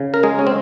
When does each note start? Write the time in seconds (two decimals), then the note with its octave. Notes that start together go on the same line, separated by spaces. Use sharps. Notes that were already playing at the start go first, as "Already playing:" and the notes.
Already playing: C#3
0.14 A#4
0.23 G#3 G#4
0.39 C#4
0.47 C4